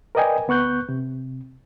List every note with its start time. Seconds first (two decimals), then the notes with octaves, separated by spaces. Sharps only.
0.15 A#4 B4 D5 D#5 G5 G#5
0.48 D2 B3 C#6 F#6 G6
0.89 C3